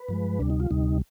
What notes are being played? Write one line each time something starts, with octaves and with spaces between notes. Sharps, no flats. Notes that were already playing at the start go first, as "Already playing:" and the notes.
Already playing: B4
G2 F3 G#3
D2 C3 G3 D4
D#4
F4
D2 C3 G3 D#4